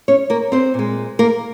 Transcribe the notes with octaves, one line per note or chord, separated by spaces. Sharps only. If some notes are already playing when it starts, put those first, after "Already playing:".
C#4 C#5
A#3 A#4
C4 C5
A#2 G#3
A#3 A#4